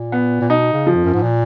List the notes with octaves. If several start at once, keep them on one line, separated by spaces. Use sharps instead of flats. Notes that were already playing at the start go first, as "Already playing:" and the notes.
Already playing: A#2
B3
A#2
B2 D#4
C#3
F3
F2
F#2
G#2
A#2